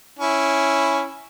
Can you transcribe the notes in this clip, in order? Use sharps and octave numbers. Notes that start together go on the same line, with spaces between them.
C#4 E4